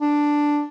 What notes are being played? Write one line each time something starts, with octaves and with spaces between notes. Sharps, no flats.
D4